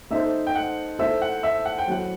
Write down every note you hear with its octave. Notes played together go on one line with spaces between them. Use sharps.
A3 D#4 A4 C5 E5
G5
F#5
A3 E4 A4 C5 E5
F#5
E5
F#5
G5
F#3 A3 E4 F#5